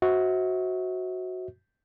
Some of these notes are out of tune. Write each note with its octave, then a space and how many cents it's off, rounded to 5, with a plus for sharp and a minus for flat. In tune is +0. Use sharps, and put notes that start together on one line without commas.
F#4 +0 C5 +0 E5 -40